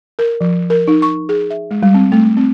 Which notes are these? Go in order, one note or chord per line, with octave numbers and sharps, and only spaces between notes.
A#4
F3
A#4
D#4
C#6
G#4
E5
G#3
G3
C4
A3
C4